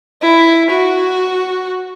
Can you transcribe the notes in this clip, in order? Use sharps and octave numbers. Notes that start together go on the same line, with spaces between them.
E4
F#4